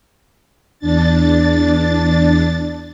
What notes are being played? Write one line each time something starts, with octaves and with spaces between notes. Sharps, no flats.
E2 D4 A6